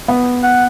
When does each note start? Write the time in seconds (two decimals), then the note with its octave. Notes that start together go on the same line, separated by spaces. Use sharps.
0.08 B3
0.43 F#5